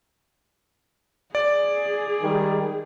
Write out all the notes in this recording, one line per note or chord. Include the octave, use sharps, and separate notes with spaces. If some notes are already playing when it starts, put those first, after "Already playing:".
G#4 D5
D#3 G3 G#3